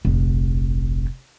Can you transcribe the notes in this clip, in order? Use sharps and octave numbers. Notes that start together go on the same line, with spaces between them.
F1 A#1